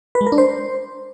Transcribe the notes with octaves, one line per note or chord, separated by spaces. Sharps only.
B4
G#3
A#4
D4
C5